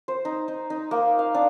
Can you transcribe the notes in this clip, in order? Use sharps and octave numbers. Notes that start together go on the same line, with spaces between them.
C5
D#4
D#4
D#4
A#3
F5
D4